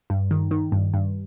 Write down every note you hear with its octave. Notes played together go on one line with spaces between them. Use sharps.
G2
D#3
D#3
G2
G2